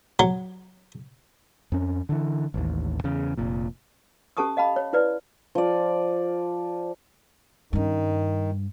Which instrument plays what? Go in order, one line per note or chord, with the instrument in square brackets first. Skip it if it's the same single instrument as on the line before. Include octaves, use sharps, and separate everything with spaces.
[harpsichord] F#3
[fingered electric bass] F2 C#4
D3 E3
A1 D#2
E2 C#3
F1 A#2
[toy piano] C#4 G4 A4 A5 C#6 D#6
D#5 F5 A5 B5
C#5
E4 B4 D5
[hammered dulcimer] F3 D5
[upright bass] G2 C#4 [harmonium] D#3 D#4